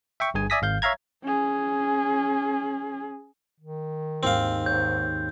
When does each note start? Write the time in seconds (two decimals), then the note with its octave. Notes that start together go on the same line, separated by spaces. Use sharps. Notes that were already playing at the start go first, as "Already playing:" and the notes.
0.20 E5 G5 C#6
0.34 G1 G2 G#4 G#5
0.50 D5 E5 G#5 D#6 A#6 B6
0.62 G#1 F5 G6
0.82 C#5 E5 F5 A#5 G#6
1.23 C#4 G#4
3.60 D#3
4.23 D#2 G#2 C4 F5
4.66 G#2 C#5 G6